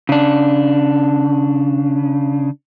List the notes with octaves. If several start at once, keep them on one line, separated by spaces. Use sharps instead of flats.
C#3 D4